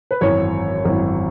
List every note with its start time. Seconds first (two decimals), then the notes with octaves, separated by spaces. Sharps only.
0.11 B4
0.21 G#1 F#2 E3 C#5
0.85 G#1 F#2 E3